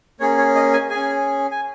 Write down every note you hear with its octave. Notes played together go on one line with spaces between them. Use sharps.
A#3 C#4 G#4 C#5
C#5
D#5
G#5
C#4 G#4 G#5
G#5